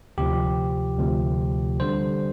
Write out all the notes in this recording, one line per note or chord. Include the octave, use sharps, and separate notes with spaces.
D2 C3 F3 G4
D2 C3 F3
D3 G3 C5